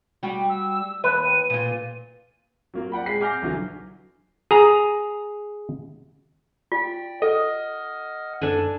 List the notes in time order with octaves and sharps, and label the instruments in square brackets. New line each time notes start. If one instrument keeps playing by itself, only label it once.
[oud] G3 F#4 G4
[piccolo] E6
[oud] D#2 [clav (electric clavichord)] B4 [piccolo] D#7
[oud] A#2 F4
[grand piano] F#3 A#3 F4
D5 F#5 G5 B5
G#3 B6 C7
G#5 D6 F6 G6 A#6
B1 D3 E3 F#3
[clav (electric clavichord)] G#4 A#5
[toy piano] F4 [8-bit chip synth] D5 G5
[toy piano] A4 [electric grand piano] D#5 [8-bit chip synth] F#5 F6
[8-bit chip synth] F#2 [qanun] D4 A4 G#5